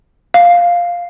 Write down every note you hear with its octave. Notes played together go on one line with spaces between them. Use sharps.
F5